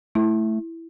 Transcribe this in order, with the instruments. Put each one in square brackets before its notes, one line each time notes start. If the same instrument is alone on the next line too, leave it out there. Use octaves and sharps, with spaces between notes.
[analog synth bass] A3 [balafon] E4